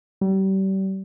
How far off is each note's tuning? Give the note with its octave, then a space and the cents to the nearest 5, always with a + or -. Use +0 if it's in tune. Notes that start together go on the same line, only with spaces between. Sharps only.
G3 -35